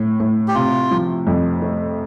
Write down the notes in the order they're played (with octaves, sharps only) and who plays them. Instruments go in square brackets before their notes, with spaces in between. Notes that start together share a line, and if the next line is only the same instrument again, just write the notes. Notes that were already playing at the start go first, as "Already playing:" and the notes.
Already playing: [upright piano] A2
A2
[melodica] G4
[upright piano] C3 [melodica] F4
[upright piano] F3
F2
A3